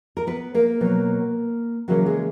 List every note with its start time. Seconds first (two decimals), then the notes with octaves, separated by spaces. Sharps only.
0.17 A#4
0.27 B3 B4
0.55 A#3 A#4
0.81 B2 F#3 B3
1.88 C#3 E3 F#3 A#3 C#4 F#4
2.06 G#3 G#4